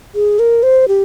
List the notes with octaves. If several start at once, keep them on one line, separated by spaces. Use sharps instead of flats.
G#4
A#4
C5
G4